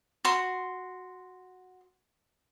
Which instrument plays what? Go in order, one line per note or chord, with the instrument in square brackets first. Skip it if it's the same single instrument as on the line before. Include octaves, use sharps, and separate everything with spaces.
[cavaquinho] F#4 C6